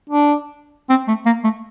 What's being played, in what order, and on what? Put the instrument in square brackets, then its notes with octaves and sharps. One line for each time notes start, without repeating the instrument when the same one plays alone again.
[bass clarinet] D4
C4
A3
A#3
A3